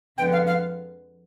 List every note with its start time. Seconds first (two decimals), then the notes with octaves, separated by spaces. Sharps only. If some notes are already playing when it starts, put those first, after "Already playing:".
0.18 F2 D3 F3 G#3 B3 G5
0.32 F5
0.47 F5